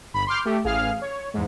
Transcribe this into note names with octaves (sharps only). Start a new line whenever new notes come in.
G1 B5
C6 D6 F6 G6
A3 G4
A1 G#4 F5 F6
C#5
E2 G#2